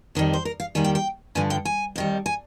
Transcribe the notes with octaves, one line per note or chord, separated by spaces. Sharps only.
F2 D#3 G3
C5
A#4
F5
D#2 D#3 G3 G#5
G5
G5
G2 D3 F3 G#5
G5
G#5
F2 D#3 G3
G#5